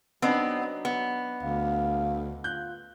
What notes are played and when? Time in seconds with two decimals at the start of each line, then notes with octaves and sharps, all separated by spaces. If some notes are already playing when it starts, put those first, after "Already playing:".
0.22 F#3 B3 C4 D4 D#4 B5
0.85 B3
1.43 D2 F5
2.44 F4 F#6 G6